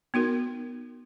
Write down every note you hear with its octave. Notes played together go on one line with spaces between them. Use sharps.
B3 D#4 F#4 A#4